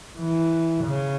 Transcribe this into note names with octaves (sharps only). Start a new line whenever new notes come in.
E3
C#3